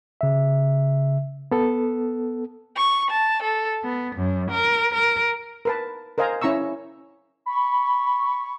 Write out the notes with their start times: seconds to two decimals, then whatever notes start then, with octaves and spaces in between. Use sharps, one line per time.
0.21 C#3 E5
1.51 B3 A4
2.76 C#6
3.10 A5
3.43 A4
3.84 B3
4.15 F#2
4.50 A#4
4.94 A#4
5.65 A#4 B4 A5
6.18 A#4 C5 D#5 F5 G#5 A#5
6.42 C#4 E4 A#5 C#6 E6
7.47 B5 C#6